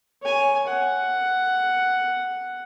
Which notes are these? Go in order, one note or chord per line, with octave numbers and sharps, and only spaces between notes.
C#5 G#5
F#5